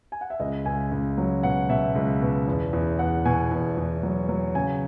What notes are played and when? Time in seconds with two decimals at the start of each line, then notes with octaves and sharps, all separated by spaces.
0.12 G#5
0.21 F#5
0.30 E5
0.40 C#2 D#5
0.66 C#2 G#5
0.92 C#2
1.18 F#3
1.43 B2 F#5
1.70 B2 E5
1.95 C#2
2.21 B2
2.48 E2
2.73 E2
2.99 E2 F#5
3.25 B2 G#5
3.51 E2
3.78 E2
4.03 F#3
4.29 F#3
4.55 C#3 G#5